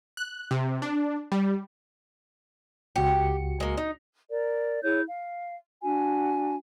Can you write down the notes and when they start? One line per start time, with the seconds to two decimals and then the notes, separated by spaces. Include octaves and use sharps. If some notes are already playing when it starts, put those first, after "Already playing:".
0.17 F#6
0.51 C3
0.82 D4
1.32 G3
2.96 C#2 F#4 G4 C#7
3.60 G#3 A#3
3.77 D#4
4.31 A#4 D5
4.84 E4 G#4 C#5 G6
5.07 F5
5.83 D4 F#4 G#5